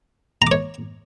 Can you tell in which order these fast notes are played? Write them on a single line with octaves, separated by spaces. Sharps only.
A#5 D6 C#5